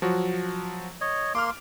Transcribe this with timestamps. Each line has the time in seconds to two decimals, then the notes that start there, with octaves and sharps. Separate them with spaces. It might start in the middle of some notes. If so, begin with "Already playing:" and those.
0.02 F3 F#3 F#4
1.01 C#5 D#5
1.35 A#3 C6 D6 F6